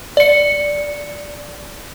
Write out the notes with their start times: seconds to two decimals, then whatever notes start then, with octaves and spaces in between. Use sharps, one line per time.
0.17 D5 C#7